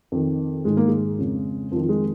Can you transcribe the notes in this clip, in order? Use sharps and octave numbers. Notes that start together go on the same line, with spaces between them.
F2 D#3
G#2 D#3 G#3
A#3
G#3
F2 C#3
F2 D#3 F3
F3
G#3